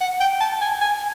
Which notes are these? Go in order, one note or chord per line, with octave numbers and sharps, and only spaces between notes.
F#5
G5
A5
G#5
G#5